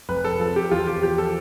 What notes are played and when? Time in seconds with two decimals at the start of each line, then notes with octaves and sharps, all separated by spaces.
0.09 F1 B4
0.24 A4
0.40 F3 A4
0.56 G4
0.71 E2 F4
0.87 G4
1.03 F3 G4
1.18 A4